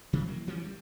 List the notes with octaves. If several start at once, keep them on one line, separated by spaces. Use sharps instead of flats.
C3 D#3
E3 F#3 A#3
D#3 E3 G3 C#4
G3